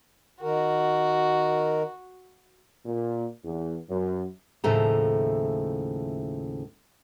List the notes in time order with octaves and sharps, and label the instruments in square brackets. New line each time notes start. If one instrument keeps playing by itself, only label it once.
[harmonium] D#3 A#4 [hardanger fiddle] F#4
[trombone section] A#2
E2
F#2
[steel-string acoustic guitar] D#2 A2 C#3 F3 A3 A#5